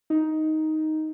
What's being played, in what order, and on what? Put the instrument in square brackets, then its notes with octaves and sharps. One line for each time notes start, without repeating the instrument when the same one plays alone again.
[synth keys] D#4